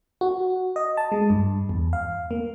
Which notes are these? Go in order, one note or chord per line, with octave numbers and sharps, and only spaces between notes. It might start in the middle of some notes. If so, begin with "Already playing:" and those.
F#4
D#5
A5
G#3
G2
E2
F5
A#3